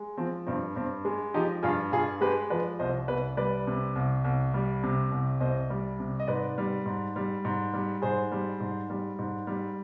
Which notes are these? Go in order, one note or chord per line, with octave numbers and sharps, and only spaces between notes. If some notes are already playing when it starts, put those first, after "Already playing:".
Already playing: G#3
F3 C4
G2 C4
G2 C4
G#3
F3 D#4 G4
G2 F4 G#4
G2 F4 G#4
G#3 G4 B4
F3 B4 D5
C2 C5 D#5
C2 B4 D5
G3 B4 D5
C3
C2
C2
G3
C3
C2
C2 C5 D#5
G3
C3
D#5
G#2 B4 D5
G3
G#2
G3
G#2
G3
G#2 G#4 C5
G3
G#2
G3
G#2
G3